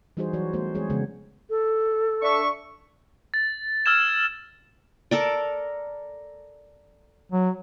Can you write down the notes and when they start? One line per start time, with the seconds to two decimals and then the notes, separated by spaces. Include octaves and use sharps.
0.17 E3 G3 D#4 F#4 G#4 C5
0.33 E3 F#3 F#4 C#5 D5
0.53 E3 G3 A3 B3 F#4 C5
0.74 E3 G#3 C4 G#4 C#5
0.90 C#3 E3 F3 G#3 B3
1.50 A4
2.22 D4 E5 C#6
3.34 A6
3.86 E6 F6 G#6 E7
5.11 A4 A#4 D5
7.32 F#3